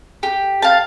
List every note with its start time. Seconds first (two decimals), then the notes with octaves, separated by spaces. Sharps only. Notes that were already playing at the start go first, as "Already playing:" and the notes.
0.23 G4
0.62 F5 A5